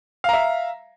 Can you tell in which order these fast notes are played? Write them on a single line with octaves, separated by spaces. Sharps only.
F5 A#5 E5